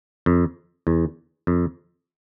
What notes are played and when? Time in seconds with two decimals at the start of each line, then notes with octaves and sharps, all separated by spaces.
0.26 F2
0.87 E2
1.47 F2